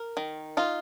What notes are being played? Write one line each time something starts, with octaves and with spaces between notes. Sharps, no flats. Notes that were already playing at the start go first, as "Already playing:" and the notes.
Already playing: A#4
D#3
D#4 F4